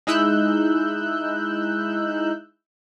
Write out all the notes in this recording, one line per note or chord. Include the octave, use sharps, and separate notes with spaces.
G#3 D#4 E4 E6 F#6 G6